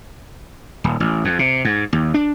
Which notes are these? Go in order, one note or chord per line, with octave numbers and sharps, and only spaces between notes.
D#1
A1
F2
C3
G#2
D#2
D4